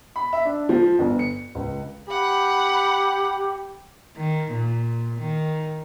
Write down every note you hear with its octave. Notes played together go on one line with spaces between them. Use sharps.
B5
E5
D4
F3
G1
C#7
C#2
G4 F#5 B5
D#3
A#2
D#3